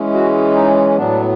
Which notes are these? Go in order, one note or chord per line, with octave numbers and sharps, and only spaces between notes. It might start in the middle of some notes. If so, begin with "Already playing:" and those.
Already playing: E3 G#3 C#4
F#4
D#4
A2 F#3 B3 D4